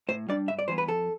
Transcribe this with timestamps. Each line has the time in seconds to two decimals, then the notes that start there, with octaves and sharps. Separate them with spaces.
0.09 A2 C5
0.29 G3 D4 D5
0.48 G2 E5
0.59 D5
0.68 E3 G3 B3 C5
0.78 B4
0.88 F2 A4